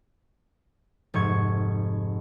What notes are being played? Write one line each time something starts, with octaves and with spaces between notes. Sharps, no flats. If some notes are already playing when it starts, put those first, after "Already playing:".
F1 G#2 C#6 G#6